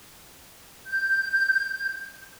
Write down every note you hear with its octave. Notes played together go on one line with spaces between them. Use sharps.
G6